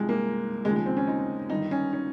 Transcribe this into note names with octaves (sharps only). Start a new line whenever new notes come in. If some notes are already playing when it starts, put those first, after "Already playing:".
Already playing: C2 C3 F3 G#3
A#3
D#2 C#3 F3 G#3
G#3
C4
C#4
D#4
G1 G2 D#3 D#4
C#4
C#4